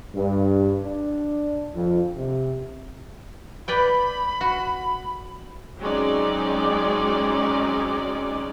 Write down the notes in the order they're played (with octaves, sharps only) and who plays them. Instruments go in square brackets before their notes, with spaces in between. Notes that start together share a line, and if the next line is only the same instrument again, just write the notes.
[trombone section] G2
D4
F2
C3
[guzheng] B4 D5 G5 [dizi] B5
[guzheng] F#4
[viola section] F#3 G#3 C4 C#4 D#4 D5